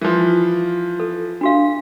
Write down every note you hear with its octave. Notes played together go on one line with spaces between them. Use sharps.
E3 F3
A4
D4 F#4 F5